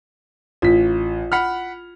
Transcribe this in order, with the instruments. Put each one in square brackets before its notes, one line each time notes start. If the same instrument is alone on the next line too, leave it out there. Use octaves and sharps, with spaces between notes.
[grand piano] A1 B6 [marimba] F4
[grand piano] F#5 B5 F6